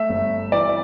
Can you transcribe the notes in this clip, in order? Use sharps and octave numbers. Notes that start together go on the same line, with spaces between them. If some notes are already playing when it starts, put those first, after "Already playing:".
Already playing: A3 E5
G1
E3 D5